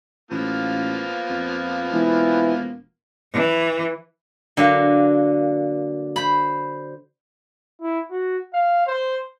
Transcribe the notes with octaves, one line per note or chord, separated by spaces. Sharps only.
A1 F3 A#3 B3
F2
E1 E3
E3
D3 F#3 A#3
C5 B5
E4
F#4
F5
C5